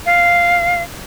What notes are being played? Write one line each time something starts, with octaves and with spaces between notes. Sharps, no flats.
F5